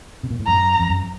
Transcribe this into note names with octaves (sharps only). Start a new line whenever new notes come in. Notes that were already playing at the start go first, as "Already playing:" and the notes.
C3
A#2
A2
F#2 A#5
F2
F#2